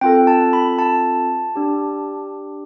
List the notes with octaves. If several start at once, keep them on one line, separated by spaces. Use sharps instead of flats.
C4 F4 A4 G5
A5
B5
A5
D4 G4